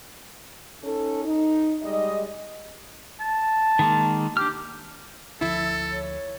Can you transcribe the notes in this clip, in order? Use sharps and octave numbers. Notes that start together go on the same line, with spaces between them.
C#4 D#4 A4
D#4
G3 G#3 D#5
A5
D#3 G#3 A#3
D4 G4 F6
D2 F3 E4 A4 E6
C#5